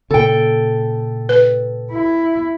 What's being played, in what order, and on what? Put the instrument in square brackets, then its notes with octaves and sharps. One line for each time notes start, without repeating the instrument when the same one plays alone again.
[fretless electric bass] A#2 C#3 [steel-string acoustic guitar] A4 G5
[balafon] B4
[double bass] E4